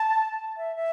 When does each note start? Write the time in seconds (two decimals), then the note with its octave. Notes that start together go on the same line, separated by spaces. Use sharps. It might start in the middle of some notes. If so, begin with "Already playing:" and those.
Already playing: A5
0.57 E5
0.76 E5